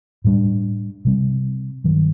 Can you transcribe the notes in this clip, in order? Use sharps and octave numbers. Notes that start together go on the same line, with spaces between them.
A2 G3 D4
C3 G3 C4
G2 D#3 F#3